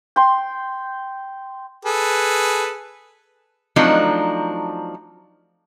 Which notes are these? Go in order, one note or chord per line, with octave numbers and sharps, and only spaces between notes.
G5 C6
G#4 A4 B4
F3 F#3 A3 C4 D4 D#4